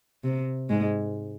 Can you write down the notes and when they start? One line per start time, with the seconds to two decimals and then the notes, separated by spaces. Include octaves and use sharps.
0.24 C3
0.69 G#2 G#3